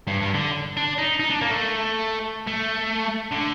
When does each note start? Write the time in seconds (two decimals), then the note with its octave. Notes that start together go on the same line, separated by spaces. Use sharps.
0.07 G2
0.20 G2
0.35 D3
0.77 D4
0.98 D#4
1.20 D#4
1.30 D4
1.41 A#3
1.51 A3
2.47 A3
3.31 D3